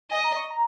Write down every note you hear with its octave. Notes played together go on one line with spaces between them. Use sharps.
D#5 G#5
A#5
C#6
A#5